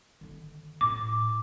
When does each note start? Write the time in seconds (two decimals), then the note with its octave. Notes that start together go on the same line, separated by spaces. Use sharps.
0.21 D3 D#3
0.81 A2 D6